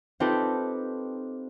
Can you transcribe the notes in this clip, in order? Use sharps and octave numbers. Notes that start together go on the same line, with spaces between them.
C4 D#4 F4 G4 A4 B4